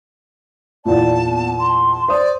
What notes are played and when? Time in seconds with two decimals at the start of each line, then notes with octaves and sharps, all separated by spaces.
0.85 E2 A#2 D5 A5
1.24 B3
1.59 C6
1.92 A5
2.08 C5 D5 D#6